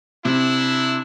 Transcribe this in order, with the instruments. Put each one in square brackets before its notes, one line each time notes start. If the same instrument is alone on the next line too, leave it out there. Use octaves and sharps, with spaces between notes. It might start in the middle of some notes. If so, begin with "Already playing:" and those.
[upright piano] C3 [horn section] D4 E4